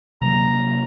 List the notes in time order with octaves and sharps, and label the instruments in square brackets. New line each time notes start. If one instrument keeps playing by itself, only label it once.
[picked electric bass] C3 F#3 A#3 [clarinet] A#5